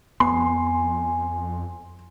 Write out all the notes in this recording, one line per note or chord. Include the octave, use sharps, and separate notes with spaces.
F2 B3 G#5 C6